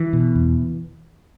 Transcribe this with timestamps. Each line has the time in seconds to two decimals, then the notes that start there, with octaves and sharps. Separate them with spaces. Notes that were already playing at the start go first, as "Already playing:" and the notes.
Already playing: E3
0.13 B2
0.35 E2